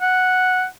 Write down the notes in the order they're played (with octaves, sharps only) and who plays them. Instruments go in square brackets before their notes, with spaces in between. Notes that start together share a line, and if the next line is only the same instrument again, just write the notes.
[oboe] F#5